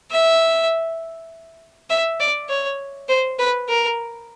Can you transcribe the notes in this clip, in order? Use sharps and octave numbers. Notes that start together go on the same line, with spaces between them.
E5
E5
D5
C#5
C5
B4
A#4